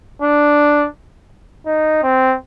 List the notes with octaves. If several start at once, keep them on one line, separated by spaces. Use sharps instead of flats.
D4
D#4
C4